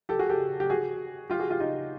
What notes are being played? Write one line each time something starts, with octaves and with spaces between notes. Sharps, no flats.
G4 A4
F#4 G#4
G4 A4
G4
F#4 G#4
F4 G4
F#4 G#4
F4 G4
D#4 F4